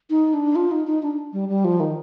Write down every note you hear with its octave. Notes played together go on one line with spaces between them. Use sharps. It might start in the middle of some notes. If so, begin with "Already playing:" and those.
D#4
D4
F4
D#4
D#4
D4
G3
G3
F3
D#3